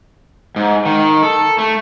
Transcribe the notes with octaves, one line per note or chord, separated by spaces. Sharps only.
G#2
D#3
A4
A3